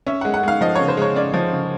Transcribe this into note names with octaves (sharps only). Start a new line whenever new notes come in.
C#4 E5
F#5
G#3
F#5
G#3 F5
F3 D#5
C#3 C#5
C5
G#3 C#5
C#4 D5
F3
C#3